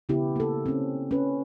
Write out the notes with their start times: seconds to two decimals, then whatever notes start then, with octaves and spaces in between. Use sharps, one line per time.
0.09 C#3 B3 E4 G4
0.36 A#3 A4
0.66 C4 C#4
1.11 C#4 B4